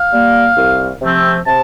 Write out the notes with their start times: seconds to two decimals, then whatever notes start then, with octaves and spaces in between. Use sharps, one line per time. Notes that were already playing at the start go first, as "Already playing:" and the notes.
Already playing: F5
0.12 G3 A#3
0.57 C2
1.01 C3 F3 A3 C4
1.47 C3 A5